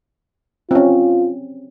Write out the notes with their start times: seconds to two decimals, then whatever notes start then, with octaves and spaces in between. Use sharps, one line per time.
0.71 C4 C#4 F4